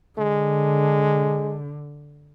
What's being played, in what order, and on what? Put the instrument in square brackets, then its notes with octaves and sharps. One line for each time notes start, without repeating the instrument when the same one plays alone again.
[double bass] D3 [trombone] G#3